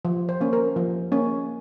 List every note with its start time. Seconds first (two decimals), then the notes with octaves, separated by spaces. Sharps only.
0.05 F3
0.29 C5
0.41 A#3 C#4
0.53 A#4
0.76 F3
1.12 A#3 C#4